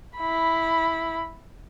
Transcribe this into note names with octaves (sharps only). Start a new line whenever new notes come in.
E4 B5